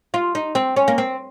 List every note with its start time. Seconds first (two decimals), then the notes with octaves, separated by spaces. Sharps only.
0.14 F4
0.35 D#4
0.55 C4
0.76 C#4
0.88 A#3
0.98 C4